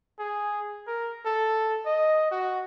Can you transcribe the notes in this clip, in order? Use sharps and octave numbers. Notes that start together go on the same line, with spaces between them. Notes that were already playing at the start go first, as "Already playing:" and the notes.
G#4
A#4
A4
D#5
F#4